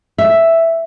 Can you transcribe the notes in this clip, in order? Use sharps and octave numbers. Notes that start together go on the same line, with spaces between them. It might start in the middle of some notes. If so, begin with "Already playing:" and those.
E5